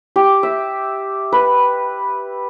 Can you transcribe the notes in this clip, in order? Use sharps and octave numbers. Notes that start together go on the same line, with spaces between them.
G4
E5
B4